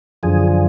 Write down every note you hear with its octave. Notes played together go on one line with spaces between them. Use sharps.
F#2 D3 F3 G#4